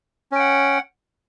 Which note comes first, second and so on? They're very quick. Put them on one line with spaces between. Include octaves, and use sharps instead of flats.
C#4 G5 F#5